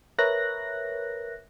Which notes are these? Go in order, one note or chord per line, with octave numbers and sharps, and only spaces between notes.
A#4 B4 C#5 E5 F#6 A#6